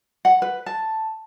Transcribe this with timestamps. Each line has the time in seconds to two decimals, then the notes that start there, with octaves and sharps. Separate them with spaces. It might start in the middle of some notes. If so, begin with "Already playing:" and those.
0.25 F#5
0.42 B4
0.66 A5